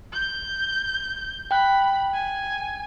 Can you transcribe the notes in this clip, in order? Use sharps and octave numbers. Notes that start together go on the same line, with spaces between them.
G6
G5 B5 F#6
G#5